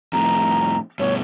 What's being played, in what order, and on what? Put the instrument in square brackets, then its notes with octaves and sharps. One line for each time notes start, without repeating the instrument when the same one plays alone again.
[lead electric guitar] F2 A2 [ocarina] A#5
[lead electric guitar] G2 B2 [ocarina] C#5